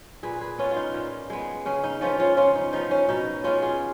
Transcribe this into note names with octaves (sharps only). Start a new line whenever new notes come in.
A#2 G#4 B4
G#4 B4
G#3 B3 C#4 F4
F4
D#4
A#2
G#3 B3
C#3 C#4
D#4
F3 B3 C#4 F4
C#4 F4
C#3 C#4 F4
D#4
F3 B3 D#4
C#4
B2 D#4
G#3 B3 C#4 F4
F4 G#4